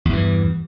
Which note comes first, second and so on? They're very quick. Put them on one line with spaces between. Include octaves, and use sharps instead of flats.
E2 G2 E3